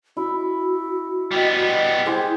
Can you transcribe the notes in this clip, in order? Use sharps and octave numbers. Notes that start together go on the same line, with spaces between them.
E4 F#4
G3 B3 D#5 G5
E4 G4 G#4 C5